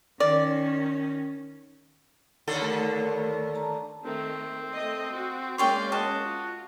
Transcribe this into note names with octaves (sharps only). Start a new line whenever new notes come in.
D#3 C#4 D5
D#2 D3 A4
A3 A#4 A5
A5 A#5
D#3 A3 C4
A3 D#5
F#4
G#3 A#3 C#4 C#5 D5 G5 C6
F#4 D#5 A5 D6
F4